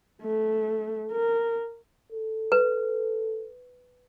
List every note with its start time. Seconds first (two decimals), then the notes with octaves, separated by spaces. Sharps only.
0.21 A3
1.12 A#4
2.12 A4
2.52 B4